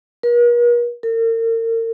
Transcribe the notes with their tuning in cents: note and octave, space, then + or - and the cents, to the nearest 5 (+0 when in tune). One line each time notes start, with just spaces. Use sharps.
A#4 +45
A#4 -40